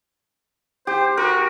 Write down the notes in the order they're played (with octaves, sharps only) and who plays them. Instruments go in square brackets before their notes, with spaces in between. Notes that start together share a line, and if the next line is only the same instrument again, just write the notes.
[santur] G4 [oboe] C5
[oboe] F#4 [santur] A#4